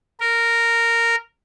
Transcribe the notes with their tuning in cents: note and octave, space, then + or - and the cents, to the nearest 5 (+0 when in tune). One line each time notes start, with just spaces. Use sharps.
A#4 -10